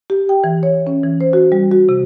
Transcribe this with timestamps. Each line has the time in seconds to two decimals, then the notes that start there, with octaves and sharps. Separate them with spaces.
0.10 G4
0.29 G5
0.44 E3
0.63 C#5
0.87 C#4
1.04 E3
1.21 C5
1.33 F#4
1.52 G3
1.71 F#4
1.89 C3